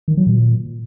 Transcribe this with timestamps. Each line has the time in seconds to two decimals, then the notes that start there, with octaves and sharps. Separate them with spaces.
0.08 D#3
0.17 F#3
0.27 A#2